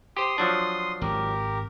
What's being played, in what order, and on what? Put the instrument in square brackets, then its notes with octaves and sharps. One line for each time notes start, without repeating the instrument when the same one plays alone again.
[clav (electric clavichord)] G4 C5 [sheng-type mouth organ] C6 D#6
[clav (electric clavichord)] F3 F#3 D4
[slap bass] G#1 [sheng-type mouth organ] G4 A#4